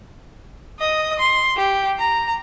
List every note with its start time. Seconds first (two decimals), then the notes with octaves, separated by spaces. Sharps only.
0.79 D#5 D#6
1.19 C6
1.56 G4
1.99 A#5